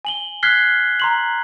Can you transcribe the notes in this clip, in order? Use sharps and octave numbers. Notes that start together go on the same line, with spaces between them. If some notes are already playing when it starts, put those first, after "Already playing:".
G#5 F#7 G7
F6 F#6 G#6 B6 C7 G7
A#5 C6 F#7